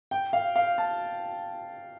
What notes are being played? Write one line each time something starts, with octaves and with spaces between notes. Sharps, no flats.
G5
F5
F5
A5